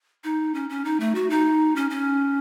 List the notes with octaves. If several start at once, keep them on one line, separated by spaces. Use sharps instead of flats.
D#4
C#4
C#4
D#4
A3
F#4
D#4
C#4
C#4